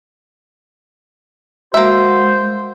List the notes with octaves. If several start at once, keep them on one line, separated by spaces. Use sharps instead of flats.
G#3 A#3 F#4 C5 E5